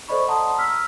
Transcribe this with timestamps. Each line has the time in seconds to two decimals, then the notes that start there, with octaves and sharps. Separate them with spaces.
0.08 A4 C5 D5 D#5 B5 C#6
0.28 F#5 A5 A#5 C6 D#6
0.58 E6 F6 B6